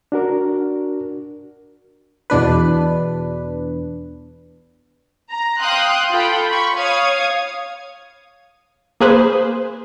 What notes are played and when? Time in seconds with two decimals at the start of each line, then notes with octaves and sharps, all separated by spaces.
0.12 D4 F#4 A#4
2.30 E2 B2 D4 B4
5.30 A#5
5.61 F5 G5 C6 D#6 F#6
6.11 F4 A4 G5 B5
6.48 B5 C#6
6.77 C#5 F5 D#6 G#6
9.00 A#3 G#4 B4 C5